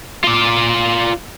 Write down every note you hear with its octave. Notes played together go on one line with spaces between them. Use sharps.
F4 D5